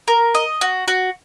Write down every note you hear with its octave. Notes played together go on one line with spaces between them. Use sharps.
A#4
D#5
F#4
F#4